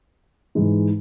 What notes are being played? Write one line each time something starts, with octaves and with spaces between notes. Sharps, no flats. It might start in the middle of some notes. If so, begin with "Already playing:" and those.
G#2 E3 G#3 D#4